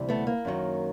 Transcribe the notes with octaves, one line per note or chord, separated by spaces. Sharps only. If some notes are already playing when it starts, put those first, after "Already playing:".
Already playing: D2 C3 E3 G3
A3 B3
A#3
F#2 D#3 F#3